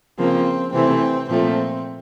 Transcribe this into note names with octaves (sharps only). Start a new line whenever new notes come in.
C#3 F3 A#3 C4
C3 E3 A3 C4
A#2 F3 A3 C4